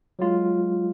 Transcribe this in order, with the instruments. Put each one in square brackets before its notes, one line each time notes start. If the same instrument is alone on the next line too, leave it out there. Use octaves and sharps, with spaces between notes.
[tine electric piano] F#3 G#3 F4